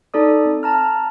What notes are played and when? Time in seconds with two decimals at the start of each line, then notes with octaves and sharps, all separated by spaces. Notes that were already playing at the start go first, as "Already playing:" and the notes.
0.14 D#4 A4 D5 D#6
0.46 C4
0.63 A5 A#5 F6